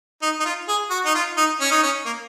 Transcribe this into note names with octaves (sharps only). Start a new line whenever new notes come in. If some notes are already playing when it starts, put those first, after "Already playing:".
D#4
D#4
F4
G#4
F#4
D#4
F4
D#4
C#4
D#4
C#4
A#3